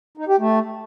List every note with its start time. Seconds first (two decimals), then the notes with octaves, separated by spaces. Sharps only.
0.17 D#4
0.28 G4
0.39 A3